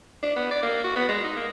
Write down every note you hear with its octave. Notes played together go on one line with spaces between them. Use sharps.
D4
B3
D5
A#3
F#4
B3
G#3
D#4
A#3